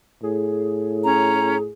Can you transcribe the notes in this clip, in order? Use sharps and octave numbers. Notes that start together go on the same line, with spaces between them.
A2 G#4
C#4 A#5